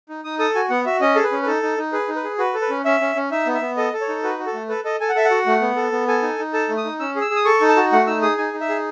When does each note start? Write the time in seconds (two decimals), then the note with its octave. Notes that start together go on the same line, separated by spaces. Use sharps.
0.09 D#4
0.24 D#4 D#6
0.39 A4 D#6
0.55 F#4 G#5
0.70 B3 F#5
0.86 F#4 E5
1.01 C#4 D#5
1.16 G#4 A4
1.24 B4
1.32 C#4
1.43 B4
1.46 D#4 A4
1.63 D#4
1.78 D#4
1.92 G#4 B4
2.08 D#4
2.16 B4
2.24 G#4
2.38 F#4 B4
2.54 A4
2.62 B4
2.70 C#4
2.85 C#4 E5
3.00 C#4
3.16 C#4
3.31 D#4 E5
3.47 B3
3.54 E5
3.61 B3
3.77 A4 D#5
3.93 A4
4.01 C#5
4.09 D#4
4.23 F#4 B4
4.39 F#4
4.46 A4
4.54 A3
4.69 A4 B4
4.84 A4 D#5
5.00 A4 G#5
5.09 F#5
5.15 A4 E5
5.25 F#5
5.31 F#4
5.46 A3
5.61 B3
5.76 A4
5.92 B3
6.07 A4 G#5
6.22 D#4
6.39 D#4
6.53 A4 A5
6.69 A3
6.77 D#6
6.85 D#4
7.00 C#4 E6
7.16 G#4
7.21 E6
7.30 G#4
7.36 D#6
7.45 A4 C#6
7.61 D#4
7.69 A5
7.76 F#4
7.92 A3 F#5
8.07 D#4 E6
8.22 G#4 D#6
8.37 D#4 G#5
8.53 D#4
8.61 E5
8.69 G#4